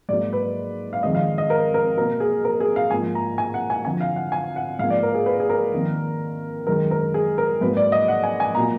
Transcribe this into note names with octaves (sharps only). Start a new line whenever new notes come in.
G#2 F#3 A#3 D5
B4
F5
F2 D#3 G#3 D#5
F5
D#5
A#4
A#4
B2 A#3 A#4
G#4
A#4
G#4
F5
G#2 F3 A#3 G#5
A#5
G#5
F#5
G#5
F2 D3 F3 G#5
F5
F#5
G#5
F#5
G#2 F3 A#3 F5
D5
A#4
G#4
B4
G#4
A#4
F2 D#3 A#3
F#2 D#3 G#3 A#4
A#4
G#4
A#4
G#2 F#3 A#3 B4
D5
D#5
F#5
G#5
G#5
A#2 F#3 A#3 A#5